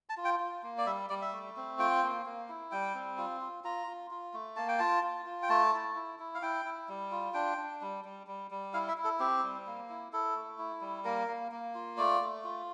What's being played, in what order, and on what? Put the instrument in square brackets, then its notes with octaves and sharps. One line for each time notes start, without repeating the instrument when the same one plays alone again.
[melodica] A5
F4
G5
F4
A#3
D5
G3 E5
G3 D5
E5
A3
C4
F4 G5
A#3
A#3
E4
G3 G5
C4
F4
F4
F4 A#5
F4
F4
A3
A#3 A5
G5
F4 A5
F4
F4
G5
A3 A5
E4
E4
E4
F5
E4 G5
E4
G3
F4
D4 G5
D4
G3
G3
G3
G3
E4 F5
E5
E4
A4
C4 G4
G3
A#3
E4
E4 A4
A3
E4
G3
A#3 A#4
A#3
A#3
F4
A3 D5
A3
F4